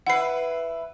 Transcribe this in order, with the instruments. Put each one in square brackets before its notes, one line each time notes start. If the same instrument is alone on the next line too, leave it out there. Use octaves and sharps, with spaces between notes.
[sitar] E4 B4 [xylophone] F#5 C7